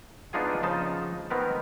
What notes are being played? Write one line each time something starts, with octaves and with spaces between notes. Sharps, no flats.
B3 D4 D#4 F4 G#4 G#5
C#3 F3 D#4 D#5 A5
D#3 B3 C4 A#4 B4